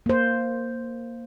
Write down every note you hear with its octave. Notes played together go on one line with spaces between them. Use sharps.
A#3 C5